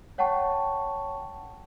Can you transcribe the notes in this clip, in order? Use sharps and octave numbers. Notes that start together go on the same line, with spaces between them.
C#5 F#5 G5 A5 C#6